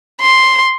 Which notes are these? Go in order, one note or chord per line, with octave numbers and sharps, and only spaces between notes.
C6